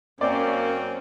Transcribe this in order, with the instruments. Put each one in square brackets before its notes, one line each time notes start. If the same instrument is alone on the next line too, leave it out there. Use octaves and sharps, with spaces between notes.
[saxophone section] F#2 C4 [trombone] A#3 [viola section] C#4 [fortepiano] D5